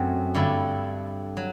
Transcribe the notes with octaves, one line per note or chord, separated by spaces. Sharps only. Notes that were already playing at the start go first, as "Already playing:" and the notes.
Already playing: F#2 F#3 A3 C4
G2 D3 A3 E4
F#3